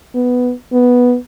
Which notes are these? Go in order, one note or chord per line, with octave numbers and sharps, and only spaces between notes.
B3
B3